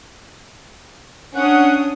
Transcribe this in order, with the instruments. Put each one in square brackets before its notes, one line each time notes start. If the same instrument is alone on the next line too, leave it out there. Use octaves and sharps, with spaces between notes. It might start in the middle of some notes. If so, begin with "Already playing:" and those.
[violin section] C#4 D4 D#6 [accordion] F#5